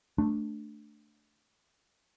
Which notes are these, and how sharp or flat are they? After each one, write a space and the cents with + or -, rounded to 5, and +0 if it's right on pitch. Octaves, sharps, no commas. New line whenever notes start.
A3 +0 D4 +0